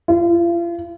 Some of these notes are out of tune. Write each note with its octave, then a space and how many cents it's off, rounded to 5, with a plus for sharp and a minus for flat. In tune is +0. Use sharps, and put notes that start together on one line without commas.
F4 -40